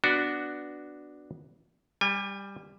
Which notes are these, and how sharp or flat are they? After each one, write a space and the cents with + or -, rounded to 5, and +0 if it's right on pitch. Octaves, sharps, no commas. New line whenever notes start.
B3 +0 D4 +0 F#4 +0
G3 +10 G#5 -35